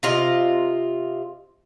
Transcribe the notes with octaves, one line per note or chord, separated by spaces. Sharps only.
C3 F4 D#5